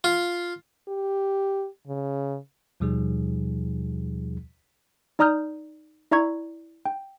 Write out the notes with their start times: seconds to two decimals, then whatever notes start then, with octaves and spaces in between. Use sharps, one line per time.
0.04 F4
0.88 G4
1.87 C#3
2.80 D#2 B2 F3 G3 D#4 G#4
5.19 D#4 D5 A#5 D#6 F6 G6
6.11 E4 D5 E5 A#5 C#6 G#6
6.85 G5